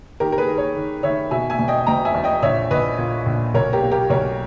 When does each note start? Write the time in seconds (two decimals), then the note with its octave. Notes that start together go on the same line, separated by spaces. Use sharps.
0.20 D#3 G4 A#4
0.32 A#4
0.38 G#4 B4
0.48 D#3
0.57 A#4 C#5
0.76 D#3
1.03 D#3 C#5 E5
1.31 B2 E5 G#5
1.50 E5 G#5
1.59 E1
1.68 D#5 G5
1.87 E1 G5 A#5
2.05 E5 G#5
2.14 E2
2.24 D#5 G5
2.43 A#1 C#5 E5
2.71 A#1 B4 D#5
2.98 A#2
3.26 A#1
3.54 B1 A#4 C#5
3.73 G4 A#4
3.83 A#3
3.91 G4 A#4
4.10 B1 A#4 C#5